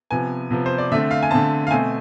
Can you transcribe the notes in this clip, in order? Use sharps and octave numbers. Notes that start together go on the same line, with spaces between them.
C3 F3 B3 G#5
C3 F3 B3
C5
D5
D3 A3 C4 E5
F5
G#5
D3 A3 C4 A5
F5
B2 A3 C4 G#5